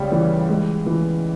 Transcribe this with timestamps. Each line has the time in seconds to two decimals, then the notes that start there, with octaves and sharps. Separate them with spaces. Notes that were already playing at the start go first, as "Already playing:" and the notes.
Already playing: C#2 C#3 G3
0.12 E3
0.49 G#3
0.86 E3